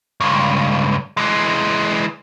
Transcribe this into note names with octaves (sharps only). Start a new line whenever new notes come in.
C#2 G2
E3 G#3